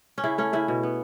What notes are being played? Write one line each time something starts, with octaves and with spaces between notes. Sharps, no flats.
C#4
C#3 E4
A3 C#4
C#3 E4
B2
B3